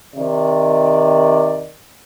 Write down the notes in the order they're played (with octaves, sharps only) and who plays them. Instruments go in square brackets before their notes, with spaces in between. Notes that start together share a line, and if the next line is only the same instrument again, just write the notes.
[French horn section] C3 D#3 D5